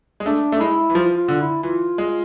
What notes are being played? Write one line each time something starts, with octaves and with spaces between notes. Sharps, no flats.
G#3
A3 D4
A3
D4
G#3 E4
E3
F3 F4
F4
D3
E4
E3 F4
G#3